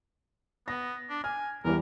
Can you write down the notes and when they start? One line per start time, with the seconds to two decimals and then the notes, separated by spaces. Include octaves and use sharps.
0.68 B3 A#6
1.09 D4
1.24 G#5 F6
1.65 E2 E3 G3 A#4